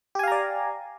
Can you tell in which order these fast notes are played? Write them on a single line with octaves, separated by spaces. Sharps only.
G4 G#5 F5 A#5 D5